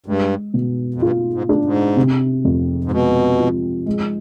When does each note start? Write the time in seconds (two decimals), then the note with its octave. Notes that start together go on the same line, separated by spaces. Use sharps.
0.06 G2 G#3
0.54 B2
0.94 F2
1.02 G2 F4
1.33 G#2
1.49 D4
1.65 G#2
1.97 C3
2.45 F2
2.84 G#2
2.92 B2 G#3
3.39 F3
3.86 G#3